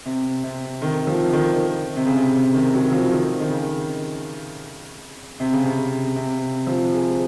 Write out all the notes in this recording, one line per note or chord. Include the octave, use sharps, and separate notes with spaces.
C3
C3
D#3
F3
D#3
C3
C#3
C3
C3
D#3
F#3
F3
D#3
D#3
C#3
C3
C#3
C3
C3
F3
G#3